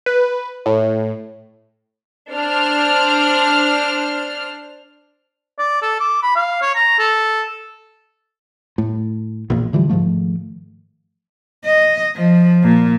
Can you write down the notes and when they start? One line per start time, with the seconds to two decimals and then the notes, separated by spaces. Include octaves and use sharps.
0.06 B4
0.66 A2
2.32 D4 C5 F6
5.59 D5
5.82 A4
6.00 D6
6.22 B5
6.36 F5
6.61 C#5
6.75 A#5
6.99 A4
8.78 A2
9.50 A#1 E2 A#2
9.73 D3 E3 F3 G3
9.89 G#2 D#3 F3 A3
11.65 D#5
12.16 F3
12.63 A#2